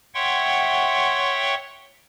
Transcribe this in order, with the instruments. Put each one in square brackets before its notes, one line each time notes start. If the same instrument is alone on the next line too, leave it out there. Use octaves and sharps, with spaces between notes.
[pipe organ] C#5 E5 F#5 G5 C6 C#6